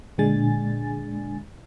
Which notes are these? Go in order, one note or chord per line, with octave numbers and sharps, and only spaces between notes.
A#2 D3 G#3 D4 G#5 A6